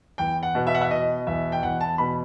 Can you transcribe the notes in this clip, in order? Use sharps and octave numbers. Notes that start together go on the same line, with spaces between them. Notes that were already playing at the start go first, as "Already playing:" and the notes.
E2 G5
F#5
B2
E5
F#5
E5
B2 D#5
E2 E5
G5
E2 F#5
A5
B2 B5